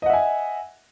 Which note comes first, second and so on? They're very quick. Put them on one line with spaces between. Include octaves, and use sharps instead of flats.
D#5 F#5 E5 G#5